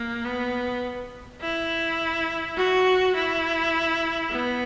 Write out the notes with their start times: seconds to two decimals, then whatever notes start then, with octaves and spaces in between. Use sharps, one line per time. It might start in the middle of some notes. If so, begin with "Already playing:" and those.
Already playing: A#3
0.25 B3
1.41 E4
2.57 F#4
3.15 E4
4.31 B3